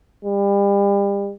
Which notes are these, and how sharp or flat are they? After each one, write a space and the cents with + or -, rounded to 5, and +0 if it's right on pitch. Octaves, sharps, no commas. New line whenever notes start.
G3 +35